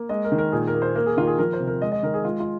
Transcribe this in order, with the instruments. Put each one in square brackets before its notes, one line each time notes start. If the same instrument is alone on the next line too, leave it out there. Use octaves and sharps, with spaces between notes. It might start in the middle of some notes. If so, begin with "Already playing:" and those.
Already playing: [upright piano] A#3
G#3 D#5
A#4
D#3
A#4
A#2 G#4
A#4
A#3
C5
A#3 A#4
G#4
D#3 F4
A#4
G#4
F3 A#4
C5
C3
A#4
G#3 D#5
D#5
D#3 A#4
G#4
G#3 F4
F4